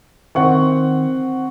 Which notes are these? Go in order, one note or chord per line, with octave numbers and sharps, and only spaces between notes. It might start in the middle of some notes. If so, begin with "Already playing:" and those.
D#3 C4 F#5 C#6